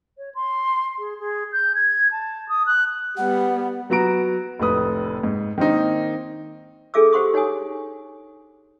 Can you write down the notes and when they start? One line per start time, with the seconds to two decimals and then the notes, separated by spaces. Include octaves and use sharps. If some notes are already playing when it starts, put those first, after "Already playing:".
0.18 C#5
0.35 C6
0.99 G#4
1.19 G#4
1.53 G6
1.75 G#6
2.12 A5
2.49 D#6
2.66 F#6
3.17 G3 B3 F#5
3.90 F#3 B3 F#4 A#5 D7
4.59 F1 A2 B4 D#6
5.23 G#2
5.58 D#3 A#3 C4 D#4
6.94 D4 G#4 A4 E5 D6 E6
7.13 G4 C5 F#5 C6 C#6 D#6
7.34 D#4 C#5 F#5 G#5 D#6